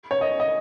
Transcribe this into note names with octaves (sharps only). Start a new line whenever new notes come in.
C#5
D#5
D#5